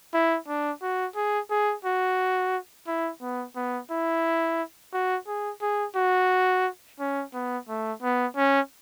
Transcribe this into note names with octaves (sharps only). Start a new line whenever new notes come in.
E4
D4
F#4
G#4
G#4
F#4
E4
B3
B3
E4
F#4
G#4
G#4
F#4
C#4
B3
A3
B3
C#4